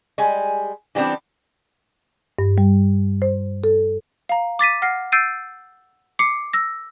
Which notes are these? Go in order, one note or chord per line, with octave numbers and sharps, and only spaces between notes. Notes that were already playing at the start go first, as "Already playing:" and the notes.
G3 G#3 G#5
E3 G3 B3 C4 D4
G2
G3
C5
A4
F5 A#5
D6 A6 B6 D#7
F#5 F6 A#6 C7
E6 G6 A6 C7 D7 D#7
D6 C7 C#7
E6 A#6